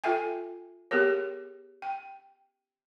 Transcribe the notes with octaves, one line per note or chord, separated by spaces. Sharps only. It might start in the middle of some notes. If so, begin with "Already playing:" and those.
F4 A4 E5 G5 G#5
B3 G4 G#4 A#4 C#5
G5